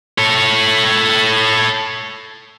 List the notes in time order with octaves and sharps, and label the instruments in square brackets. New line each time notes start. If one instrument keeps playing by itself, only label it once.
[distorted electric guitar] A4 C#5